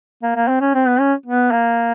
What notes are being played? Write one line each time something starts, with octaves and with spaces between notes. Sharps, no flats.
A#3
A#3
C4
C#4
C4
B3
C#4
B3
A#3